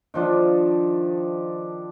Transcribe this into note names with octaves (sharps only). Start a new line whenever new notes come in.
D#3 F3 D4